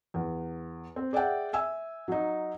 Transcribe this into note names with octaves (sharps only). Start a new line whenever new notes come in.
E2
C4
G#4 D5 E5 F#5 G5
E5 G#5 E6
F#3 D#4